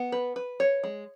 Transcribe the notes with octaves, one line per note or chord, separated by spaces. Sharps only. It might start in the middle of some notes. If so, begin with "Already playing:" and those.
Already playing: B3
B4
B4
C#5
G#3